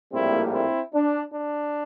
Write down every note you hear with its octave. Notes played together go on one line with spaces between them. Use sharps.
A#1 A2 G3 A#3 C4 E4
C4 E4
D4
D4